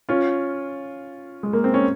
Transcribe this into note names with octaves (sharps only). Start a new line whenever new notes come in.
C#4 F4
G#3
A#3
C4
C#4